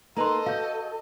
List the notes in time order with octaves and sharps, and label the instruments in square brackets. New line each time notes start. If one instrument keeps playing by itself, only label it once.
[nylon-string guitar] A#3 D#4 B4 [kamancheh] A4 D#5 [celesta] A#5 C6
[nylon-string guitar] F#4 [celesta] F5 G6